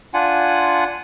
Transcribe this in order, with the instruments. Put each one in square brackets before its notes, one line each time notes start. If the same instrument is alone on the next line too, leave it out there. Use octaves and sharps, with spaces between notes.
[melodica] D4 F4 F#5 G#5